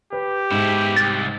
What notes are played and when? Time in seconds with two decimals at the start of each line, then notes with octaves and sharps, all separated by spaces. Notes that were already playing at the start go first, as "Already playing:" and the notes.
0.13 G4 B4
0.52 G#2 B2 E4
0.97 C2 A6